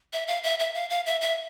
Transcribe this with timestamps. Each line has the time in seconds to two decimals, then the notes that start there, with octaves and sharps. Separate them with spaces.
0.13 E5
0.28 F5
0.44 E5
0.60 E5
0.75 F5
0.90 F5
1.06 E5
1.21 E5